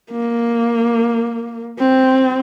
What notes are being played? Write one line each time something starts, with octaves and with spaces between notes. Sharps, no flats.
A#3
C4